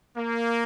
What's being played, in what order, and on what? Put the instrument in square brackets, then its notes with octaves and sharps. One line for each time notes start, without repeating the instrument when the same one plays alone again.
[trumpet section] A#3